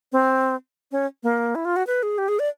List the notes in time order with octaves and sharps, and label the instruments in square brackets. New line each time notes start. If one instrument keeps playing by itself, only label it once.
[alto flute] C4
C#4
A#3
E4
F4
F#4
B4
G#4
G4
G#4
D5